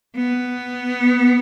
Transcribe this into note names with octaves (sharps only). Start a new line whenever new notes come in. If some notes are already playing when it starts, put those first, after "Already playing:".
B3